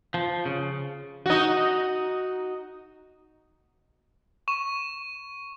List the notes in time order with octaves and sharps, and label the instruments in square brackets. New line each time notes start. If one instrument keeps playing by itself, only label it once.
[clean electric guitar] F3
C#3
[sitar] D#4 F#4
[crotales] C#6 E7